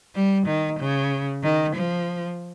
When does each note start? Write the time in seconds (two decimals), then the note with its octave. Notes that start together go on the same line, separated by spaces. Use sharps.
0.15 G3
0.47 D#3
0.80 C#3
1.43 D#3
1.76 F3